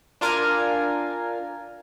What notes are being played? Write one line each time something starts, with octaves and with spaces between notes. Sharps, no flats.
D4 F4 A#4 F5 G#5